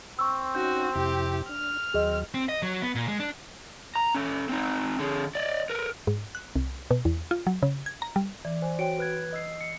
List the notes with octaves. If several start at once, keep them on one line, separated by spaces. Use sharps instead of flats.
C4 C#6 E6
C#4 D#4 F#4 G6
F2 C3 E4 G4
D4 F6
D#2 F#3 C4 G#4 D#5
C4
D#5
F#3
B3
A#2
G#3
D4
A#5
C#4 A4
C4 D#4
D3 G#4
D5 D#5
A#4 B4
G#2
F#6
C2
B2
E2
F4
F#3
C#3
G#6
A#5
G3
E3 D5
C5 G#5
F#4 C#5 G5 D7
B4 F#6 G#6
D#5 E6 C7
C#7